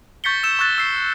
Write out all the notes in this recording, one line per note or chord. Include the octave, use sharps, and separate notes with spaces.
C#6 G6 A6 B6 C#7 G7
E6 E7
C#6 E6 F#6 A6 E7
E6 C7